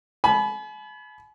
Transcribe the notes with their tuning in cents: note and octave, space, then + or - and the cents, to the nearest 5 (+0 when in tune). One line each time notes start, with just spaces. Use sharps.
G#5 +45 B5 +0